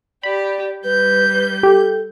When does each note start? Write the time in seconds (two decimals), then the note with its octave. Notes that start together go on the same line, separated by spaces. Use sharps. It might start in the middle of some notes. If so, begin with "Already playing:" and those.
0.23 G4 D5 B5
0.84 G3 B4 G6
1.63 G4 A4